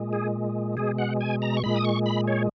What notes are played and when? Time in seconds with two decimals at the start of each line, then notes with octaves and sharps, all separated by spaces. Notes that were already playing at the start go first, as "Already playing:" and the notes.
Already playing: A#2 G#3
0.13 G#4
0.77 B2 G#3 G#4
0.98 F#5
1.21 G#5
1.42 A#5
1.57 C#6
1.64 A#2 G#3 B5
1.76 D#6
1.84 C#6
2.06 B5
2.28 C#5